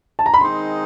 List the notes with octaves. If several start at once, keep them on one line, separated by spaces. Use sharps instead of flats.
A5
A#5
B5
D#3 G#3 C4 D#4 C6